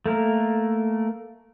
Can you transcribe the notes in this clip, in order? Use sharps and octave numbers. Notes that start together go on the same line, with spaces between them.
A3 A#3 A#4